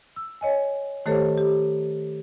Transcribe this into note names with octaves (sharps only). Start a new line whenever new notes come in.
E6
C#5 D#5 G#5
D#3 A3 G4 A4 C5 C#5
G4